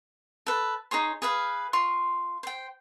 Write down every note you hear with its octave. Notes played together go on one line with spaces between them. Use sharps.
A4 B4
D#4 G#4 C#5 C6
G#4 B4 F5
F4 C6 C#6
C5 G5